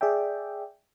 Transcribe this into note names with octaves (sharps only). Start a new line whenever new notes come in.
G#4 D5 E5 G5